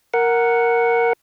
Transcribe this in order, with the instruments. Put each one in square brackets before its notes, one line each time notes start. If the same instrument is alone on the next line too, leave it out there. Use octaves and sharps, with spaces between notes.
[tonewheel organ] A#4 F#5